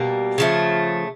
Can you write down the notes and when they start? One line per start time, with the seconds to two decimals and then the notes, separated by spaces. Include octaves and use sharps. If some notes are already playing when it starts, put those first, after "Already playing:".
Already playing: B2 G3 A#3
0.38 C#3 F3 A3